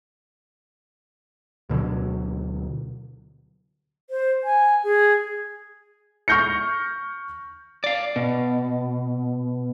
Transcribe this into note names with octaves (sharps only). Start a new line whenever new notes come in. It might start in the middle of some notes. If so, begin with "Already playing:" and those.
D2 B2 D3 F#3
C5
G#5
G#4
C#6 F6 G6 A#6 C#7
D5 F5
B2